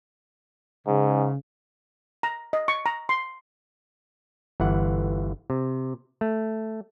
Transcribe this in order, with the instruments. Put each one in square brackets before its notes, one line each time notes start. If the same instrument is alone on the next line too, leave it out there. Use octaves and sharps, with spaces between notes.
[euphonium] G#2 [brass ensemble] C#3
[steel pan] A#5
D#5
C#6
A#5
C6
[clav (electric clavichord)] G1 E3 F#5
C3
A3